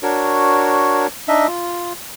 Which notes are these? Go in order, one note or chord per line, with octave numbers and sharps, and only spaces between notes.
D4 F#4 A#4 C#5
D4 D#4 D#5 E5
F4